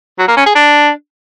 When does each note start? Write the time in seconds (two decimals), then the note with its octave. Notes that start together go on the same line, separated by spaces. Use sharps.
0.19 F#3
0.28 A#3
0.37 C#4
0.46 G#4
0.55 D4